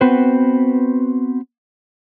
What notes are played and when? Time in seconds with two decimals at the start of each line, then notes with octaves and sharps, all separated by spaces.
0.01 B3 C4 F#4 B4 C5